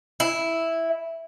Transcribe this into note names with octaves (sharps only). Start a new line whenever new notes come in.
E4